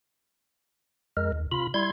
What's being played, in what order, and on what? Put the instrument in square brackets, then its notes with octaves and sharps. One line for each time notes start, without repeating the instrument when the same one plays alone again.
[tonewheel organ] F2 G#3 A#4
D#2
C3 F4 B5
G3 E4 C6 G#6